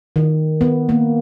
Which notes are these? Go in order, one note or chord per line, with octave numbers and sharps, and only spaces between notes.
D#3
B3
A#3